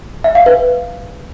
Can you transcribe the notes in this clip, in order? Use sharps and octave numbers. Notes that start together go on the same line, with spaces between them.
E5
F5
B4